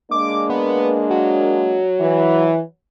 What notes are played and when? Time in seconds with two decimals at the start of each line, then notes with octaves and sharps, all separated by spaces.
0.11 G#3 A#3 D4 D6
0.50 B3
1.10 F#3
2.00 E3